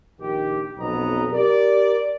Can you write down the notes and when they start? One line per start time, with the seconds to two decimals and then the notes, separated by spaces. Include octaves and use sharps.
0.20 A#1 D#3 G4
0.78 B1 F2 B3 D#5 A#5
1.32 G4 A#4 D5